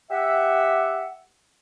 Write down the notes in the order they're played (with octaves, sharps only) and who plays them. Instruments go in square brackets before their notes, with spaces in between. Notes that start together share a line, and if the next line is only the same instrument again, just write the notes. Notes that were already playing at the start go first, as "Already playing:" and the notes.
[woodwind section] G4 E5 F#5